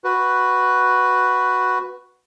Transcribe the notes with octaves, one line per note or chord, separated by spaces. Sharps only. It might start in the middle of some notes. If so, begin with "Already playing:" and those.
F#4 B4